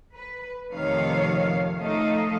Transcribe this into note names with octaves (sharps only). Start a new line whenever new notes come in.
B4
F2 C3 D#3 A3 C#5 F5
F3 A3 D#4 D#5 F5